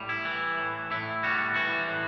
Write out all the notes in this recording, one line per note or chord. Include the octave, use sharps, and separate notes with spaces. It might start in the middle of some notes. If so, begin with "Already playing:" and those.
Already playing: A2 G3
E4
E3
A2
A2 E4
G3 F#4
E3 F#4
A2